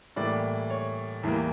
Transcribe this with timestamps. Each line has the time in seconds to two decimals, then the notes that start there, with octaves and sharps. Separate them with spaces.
0.16 A2 E3 G3 A#3 D5
0.70 C#5
1.23 E2 E3 G3 A#3